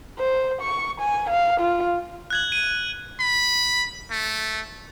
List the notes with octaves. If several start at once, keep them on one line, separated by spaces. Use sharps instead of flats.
C5
C#6
G#5
F5
F4
F#6 G#6 F#7
D#7
B5
A3